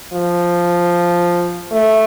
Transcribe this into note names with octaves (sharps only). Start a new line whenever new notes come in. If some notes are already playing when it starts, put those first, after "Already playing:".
F3
A3